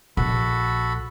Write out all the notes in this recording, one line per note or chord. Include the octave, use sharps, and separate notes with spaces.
A#1 F#4 A4 B5